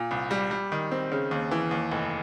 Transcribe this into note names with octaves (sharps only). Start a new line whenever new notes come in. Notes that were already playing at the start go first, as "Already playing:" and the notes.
Already playing: A#2
C2
G3
G3
D#3
C4
C#3
D#2
E3
D#2
F1